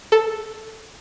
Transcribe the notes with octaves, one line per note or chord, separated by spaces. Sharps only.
A4